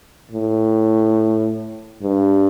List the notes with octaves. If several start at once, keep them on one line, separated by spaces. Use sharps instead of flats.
A2
G2